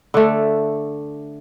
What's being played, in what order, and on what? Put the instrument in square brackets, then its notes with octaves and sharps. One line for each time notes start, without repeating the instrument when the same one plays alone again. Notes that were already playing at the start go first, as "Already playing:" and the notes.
[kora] D3 A3